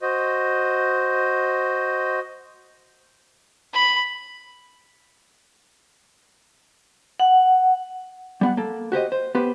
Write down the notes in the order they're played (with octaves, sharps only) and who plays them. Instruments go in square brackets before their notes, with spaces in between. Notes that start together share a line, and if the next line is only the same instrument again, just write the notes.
[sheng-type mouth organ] F#4 C5 D#5
[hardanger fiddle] B5
[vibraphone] F#5
[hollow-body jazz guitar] G3 B3 F#5
A#3 A4
F#4 G4 C5 D#5
C5
B3 G4 B4 C5